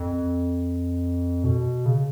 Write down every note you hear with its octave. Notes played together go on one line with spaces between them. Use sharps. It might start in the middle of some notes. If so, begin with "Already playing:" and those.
Already playing: F2
B2
C#3